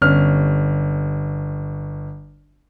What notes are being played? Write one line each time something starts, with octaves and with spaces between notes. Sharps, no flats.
G1 C#4 F6